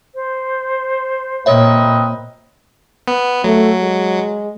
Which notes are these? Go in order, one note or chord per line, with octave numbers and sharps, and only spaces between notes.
C5
A#2 A#3 C4 B4 C#5 D#5 E5
B3
F#3 A3
G#3